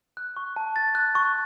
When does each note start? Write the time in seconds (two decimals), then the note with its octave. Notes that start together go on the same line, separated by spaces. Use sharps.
0.17 F#6
0.37 C#6
0.56 A5
0.76 A6
0.95 F#6
1.15 C#6